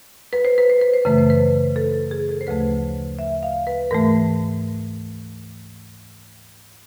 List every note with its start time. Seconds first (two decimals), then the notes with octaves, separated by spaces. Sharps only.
0.33 B4
0.45 C5
0.58 B4
0.70 C5
0.82 B4
0.93 C5
1.05 F#2 C#3 E3 A3 B4
1.18 C5
1.30 B4
1.76 A4
2.11 G#4
2.29 A4
2.41 C5
2.47 D2 C#3 F3 A3 B4
3.19 E5
3.43 F5
3.67 B4
3.91 G#2 E3 A3 A#4